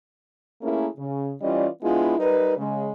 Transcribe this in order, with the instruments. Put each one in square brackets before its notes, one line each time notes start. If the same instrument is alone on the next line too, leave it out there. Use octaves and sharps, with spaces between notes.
[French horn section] A3 A#3 C#4 E4 G#4 A#4
C#3
E3 G3 C#4 F4 D5 D#5
G#3 B3 D4 E4 F4
G3 D#4 A#4 B4
C#3 G#3